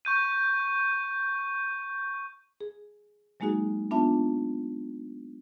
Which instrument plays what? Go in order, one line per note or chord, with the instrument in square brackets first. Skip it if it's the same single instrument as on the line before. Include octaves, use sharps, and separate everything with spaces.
[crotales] C#6 G6 D#7
[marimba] G#4
F#3 G#3 A#3 D#4 F#4 G#4
B3 D4 F4 E5 A5